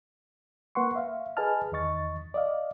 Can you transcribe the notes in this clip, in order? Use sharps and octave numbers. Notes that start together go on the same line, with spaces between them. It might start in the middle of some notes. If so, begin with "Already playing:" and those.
A#3 B4 F#5 C6 C#6
E5 F5
G#4 B4 D#5 G#5 A5 F6
E2 D#3 D#5 C#6 A6
D5 D#5 F5